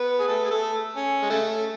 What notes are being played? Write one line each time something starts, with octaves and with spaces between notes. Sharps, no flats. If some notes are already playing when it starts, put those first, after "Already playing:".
Already playing: B3 B4
G#4
A3 A4
G#4
A3 A4
C#4
G#3
C#3 A3